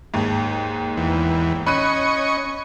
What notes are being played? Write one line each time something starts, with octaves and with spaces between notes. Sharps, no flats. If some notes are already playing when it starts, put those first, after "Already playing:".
D#2 G#2
E2
C#4 D#5 B5 C#6 F#6 D#7